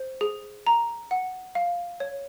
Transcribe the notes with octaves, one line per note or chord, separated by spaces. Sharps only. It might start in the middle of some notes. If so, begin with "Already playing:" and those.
Already playing: C5
G#4
A#5
F#5
F5
C#5